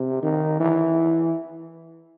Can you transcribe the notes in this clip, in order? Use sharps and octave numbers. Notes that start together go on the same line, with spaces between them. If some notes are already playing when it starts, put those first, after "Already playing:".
Already playing: C3
D#3
E3